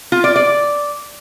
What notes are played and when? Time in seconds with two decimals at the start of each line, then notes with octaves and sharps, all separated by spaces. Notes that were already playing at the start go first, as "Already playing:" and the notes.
0.12 F4
0.24 D5
0.36 D5